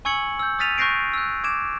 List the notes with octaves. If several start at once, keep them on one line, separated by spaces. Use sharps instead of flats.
G#5 C#6 E6 G#6 C#7 F#7
E6 G6
D#6 F6 A6 B6 D#7 F7
C#6 F#6 G6 A#6 C7 D7
E6 F#6
D6 G#6 D7 E7